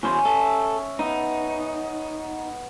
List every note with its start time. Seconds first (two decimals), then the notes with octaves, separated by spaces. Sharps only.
0.03 E2 B2 C#4 C5
0.25 A4 E5
0.99 B3 D#4